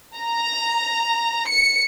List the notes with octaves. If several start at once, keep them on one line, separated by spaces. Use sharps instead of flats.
A#5
C#7